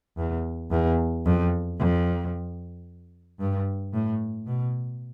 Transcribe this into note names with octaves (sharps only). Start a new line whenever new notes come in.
E2
E2
F2
F2
G2
A2
B2